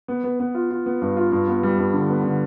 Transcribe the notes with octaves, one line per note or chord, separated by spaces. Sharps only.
B3
B3
B3
F4
F4
B3
G2
F4
G2
B3
G3
G2
D3
B3
D3